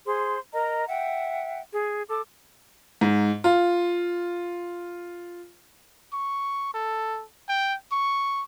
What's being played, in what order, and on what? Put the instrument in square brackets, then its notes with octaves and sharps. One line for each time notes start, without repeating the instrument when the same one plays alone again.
[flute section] G#4 C5 C6
A#4 D#5 A#5
E5 F#5 G5
G#4
A4 D6
[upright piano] G#2
F4
[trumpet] C#6
A4
G5
C#6